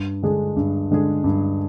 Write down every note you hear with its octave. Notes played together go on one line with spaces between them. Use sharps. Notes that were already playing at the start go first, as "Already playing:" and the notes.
Already playing: G2
D3 G#3 D4 G#4
G2
D3 G#3 D4 G#4
G2